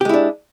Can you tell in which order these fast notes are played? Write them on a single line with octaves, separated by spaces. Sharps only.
G4 G#3 E4 D4